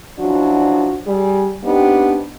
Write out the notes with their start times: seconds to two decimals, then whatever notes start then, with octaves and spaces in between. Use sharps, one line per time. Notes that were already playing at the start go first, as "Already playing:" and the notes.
0.19 F3 F#3 C#4 D4 E4 F#4
1.06 G3 G#4
1.64 B3 C4 D4 D#4 G4